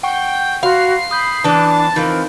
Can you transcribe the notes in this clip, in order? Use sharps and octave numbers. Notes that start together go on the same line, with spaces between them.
F#5 G5 C#6
F#4 F5 B5 C6 C7
B5 D#6 G6
E3 B3 D4 A5
E3 F3 C4 D#4 A#4 G6